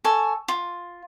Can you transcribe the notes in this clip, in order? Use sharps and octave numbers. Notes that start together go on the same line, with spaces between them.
A4 C#5 G#5
F4